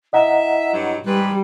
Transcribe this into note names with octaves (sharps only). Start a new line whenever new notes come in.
E4 D#5 E5 F#5 A#5
G2 F#3
G#2 G3 G4 B4